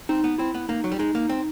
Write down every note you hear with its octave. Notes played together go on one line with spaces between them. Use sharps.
C4 D#4
B3
C4 E4
B3
A#3 D#4
F#3
G3
G#3 D#4
A#3
C4